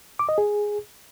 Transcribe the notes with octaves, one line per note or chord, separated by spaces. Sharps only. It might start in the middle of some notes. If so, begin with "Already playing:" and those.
D6
D#5
G#4